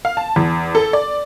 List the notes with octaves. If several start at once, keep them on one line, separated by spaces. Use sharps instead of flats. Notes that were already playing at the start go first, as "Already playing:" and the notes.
F5
A5
E2
A4
D5